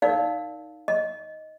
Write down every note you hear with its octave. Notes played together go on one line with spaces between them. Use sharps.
D#4 A#4 D5 F5
D#5